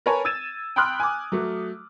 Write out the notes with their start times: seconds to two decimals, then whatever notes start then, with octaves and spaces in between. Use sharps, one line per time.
0.06 A#4 B4 C#5 G#5 A5
0.25 E6 G#6 A6 D#7 E7
0.76 G5 B5 C6 D#6 F6 F#6
1.00 G#5 D6
1.32 F#3 A3